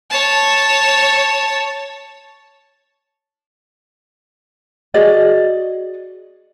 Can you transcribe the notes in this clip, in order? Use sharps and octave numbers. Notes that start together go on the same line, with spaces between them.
C#5 A5
F#4 G#4 D5 D#5